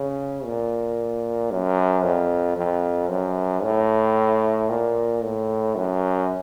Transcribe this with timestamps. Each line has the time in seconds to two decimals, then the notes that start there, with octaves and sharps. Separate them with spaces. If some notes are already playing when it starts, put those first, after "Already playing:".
Already playing: C#3
0.45 A#2
1.51 F#2
2.04 F2
2.57 F2
3.10 F#2
3.63 A2
4.69 A#2
5.23 A2
5.76 F#2